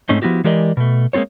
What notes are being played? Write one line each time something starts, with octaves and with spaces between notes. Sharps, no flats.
G#2 A3 C4 C#4 D#4
F3 B3 E4 F#4 G4
E3 G#3 G4 A#4 D5 D#5
B2 A3
G#3 A#3 C4 F4 C#5